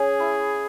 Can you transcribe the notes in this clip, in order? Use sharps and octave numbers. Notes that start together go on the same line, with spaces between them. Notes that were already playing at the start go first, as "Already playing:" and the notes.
Already playing: C#4 G#4
E4